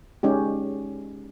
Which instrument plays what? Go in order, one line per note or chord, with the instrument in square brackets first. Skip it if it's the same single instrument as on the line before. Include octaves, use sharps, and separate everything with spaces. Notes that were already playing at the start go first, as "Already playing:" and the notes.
[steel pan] G#3 C#4 D#4 G4